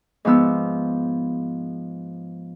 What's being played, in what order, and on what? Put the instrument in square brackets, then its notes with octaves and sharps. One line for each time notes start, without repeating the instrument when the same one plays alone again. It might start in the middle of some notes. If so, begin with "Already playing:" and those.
[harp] G#2 F3 B3 E6